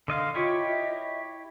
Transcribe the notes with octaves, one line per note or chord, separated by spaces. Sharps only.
D3 D#5 F5 C6
E4 F4 G4 C#5 D#5
E5